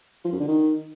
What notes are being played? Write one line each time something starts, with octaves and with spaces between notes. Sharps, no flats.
F3
F#2
D3
D#3